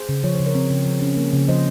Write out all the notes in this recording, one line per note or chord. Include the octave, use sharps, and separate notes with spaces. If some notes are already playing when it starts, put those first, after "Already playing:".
Already playing: G#4 C5
C#3
F3 C#5
C5
C#3
A#4 C#5
C4
C#3
F3
C#4
A#3
C#3
F3 C5 D#5